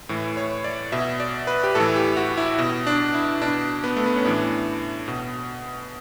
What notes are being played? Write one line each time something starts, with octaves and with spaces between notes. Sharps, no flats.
A2 E3
C#5
D5
B2 E5
D5
B4
G4
A2 E3 A4
G4
F#4
E4
B2
D4
E4
B2 D4
B3
A3
B3
C#4
A2 E3 D4
B2